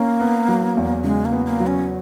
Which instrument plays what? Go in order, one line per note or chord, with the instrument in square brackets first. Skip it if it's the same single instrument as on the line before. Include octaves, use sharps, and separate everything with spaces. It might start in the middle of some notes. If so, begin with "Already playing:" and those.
Already playing: [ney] A#3 [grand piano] C#4
[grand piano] B3
F#3
E2
[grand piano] C#3 [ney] G#3
[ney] A#3
[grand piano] B3
[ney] A#3
[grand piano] F#3
[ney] C#4